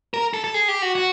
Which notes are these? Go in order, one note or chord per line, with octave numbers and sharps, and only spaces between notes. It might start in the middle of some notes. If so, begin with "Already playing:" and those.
A#4
A4
A4
G#4
G4
F#4
F#4